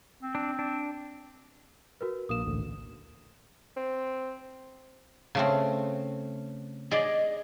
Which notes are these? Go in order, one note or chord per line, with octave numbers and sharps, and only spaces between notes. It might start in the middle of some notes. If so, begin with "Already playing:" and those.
C4
D4
D4
F#4 A#4 B4
A#1 A#3 D#6 E7
A1 D2 D3
C4
C#3 A3 C4
G#4 D5 D#5